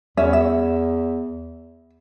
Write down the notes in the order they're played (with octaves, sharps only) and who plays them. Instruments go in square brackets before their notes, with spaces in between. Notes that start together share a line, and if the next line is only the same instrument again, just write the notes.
[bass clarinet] E2 [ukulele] C#4 E5
[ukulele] E5